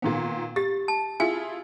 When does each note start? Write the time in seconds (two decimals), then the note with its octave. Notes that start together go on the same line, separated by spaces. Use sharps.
0.02 A#2 D#3 B3
0.56 G4 A6
0.88 A5
1.20 E4 F4 G#4 G#5